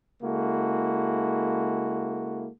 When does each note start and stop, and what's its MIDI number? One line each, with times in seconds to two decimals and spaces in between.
0.23 2.48 49
0.23 2.48 56
0.23 2.48 58
0.23 2.48 64
0.23 2.48 66
0.23 2.48 69